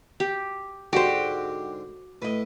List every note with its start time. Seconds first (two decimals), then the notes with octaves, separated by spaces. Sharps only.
0.20 G4
0.93 G#2 D3 D4 F#4 G4 C5
2.22 A2 B4 D#5